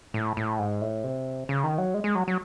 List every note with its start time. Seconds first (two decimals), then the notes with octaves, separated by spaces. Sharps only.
0.14 A2
0.37 A2
0.59 G#2
0.81 A2
1.04 C3
1.49 C#3
1.64 D#3
1.78 F#3
1.94 G#3
2.04 G#3
2.15 F#3
2.28 F#3